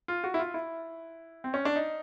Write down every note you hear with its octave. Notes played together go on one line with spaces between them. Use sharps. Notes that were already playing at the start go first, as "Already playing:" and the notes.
F4
F#4
E4
F4
E4
C4
C#4
D4
D#4